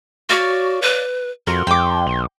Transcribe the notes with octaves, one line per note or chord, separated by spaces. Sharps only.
F#4 C#5 D5 F5
B4
F2 F#4 A#4 C6
F2 G5 D6
B1